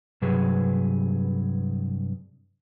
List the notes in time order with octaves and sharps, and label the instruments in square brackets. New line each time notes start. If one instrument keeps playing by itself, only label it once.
[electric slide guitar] G2 C3 F#3 G#4 B4